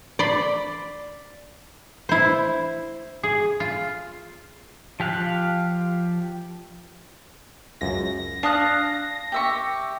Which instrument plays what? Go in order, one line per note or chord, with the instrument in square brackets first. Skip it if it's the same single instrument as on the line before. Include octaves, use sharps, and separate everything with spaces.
[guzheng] D5 B5 C6
E4 C5
[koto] G#4
F4
[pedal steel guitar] F3 G4 F5 F#6
[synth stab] C#2 F#2 [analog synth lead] A#6
[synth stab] D4 F6 [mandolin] F5 D#6 F#6 [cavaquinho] A5
[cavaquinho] G4 E5 C#6